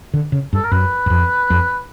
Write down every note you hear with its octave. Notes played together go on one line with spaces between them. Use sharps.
D3
C#3
G2 A4
A#4
F#2 B4
F#2
F2
F2